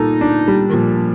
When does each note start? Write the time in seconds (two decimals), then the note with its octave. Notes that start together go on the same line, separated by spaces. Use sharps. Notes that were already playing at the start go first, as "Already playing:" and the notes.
Already playing: A#2 G3 D#4 A4
0.21 D4
0.48 G3
0.69 D#3
0.73 A#2 F3